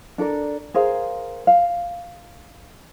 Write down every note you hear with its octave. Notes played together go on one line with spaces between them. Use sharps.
D4 A4 A#4 D5
G#4 A#4 C5 F5
F5